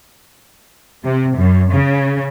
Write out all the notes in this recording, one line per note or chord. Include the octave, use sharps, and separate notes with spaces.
C3
F#2
C#3